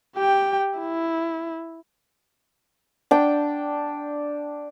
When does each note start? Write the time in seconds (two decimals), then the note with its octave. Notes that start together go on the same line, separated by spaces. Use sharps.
0.16 G4 G5
0.80 E4
3.11 D4 G5